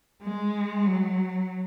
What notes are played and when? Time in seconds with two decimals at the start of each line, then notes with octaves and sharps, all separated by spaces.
0.22 G#3
0.86 F#3